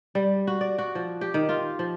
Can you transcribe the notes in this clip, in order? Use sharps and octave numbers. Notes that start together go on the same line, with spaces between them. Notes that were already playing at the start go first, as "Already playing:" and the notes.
G3
F#4
D5
F#4
F3
G4
D#3
F4
F3